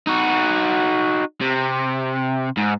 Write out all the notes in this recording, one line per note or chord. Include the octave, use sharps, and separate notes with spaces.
D#4 F#4
C3
G#2